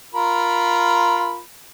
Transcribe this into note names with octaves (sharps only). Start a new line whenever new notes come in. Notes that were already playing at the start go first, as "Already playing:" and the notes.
F4 A#4 B5